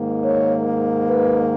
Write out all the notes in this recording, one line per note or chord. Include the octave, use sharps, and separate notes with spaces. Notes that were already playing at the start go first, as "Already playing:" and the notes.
Already playing: G#2 D#3 A#3
C#5
B4